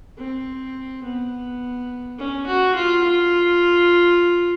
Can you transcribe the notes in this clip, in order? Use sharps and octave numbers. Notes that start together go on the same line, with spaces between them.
C4
B3
C#4
F#4
F4
F4